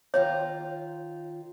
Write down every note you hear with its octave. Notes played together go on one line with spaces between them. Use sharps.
D#3 F4 C#5 A#5